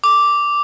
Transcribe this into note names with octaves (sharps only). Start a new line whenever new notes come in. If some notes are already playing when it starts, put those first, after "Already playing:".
D6